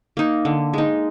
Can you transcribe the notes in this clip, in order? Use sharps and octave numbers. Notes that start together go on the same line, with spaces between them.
A#3 D#4
D3
G#3 D#4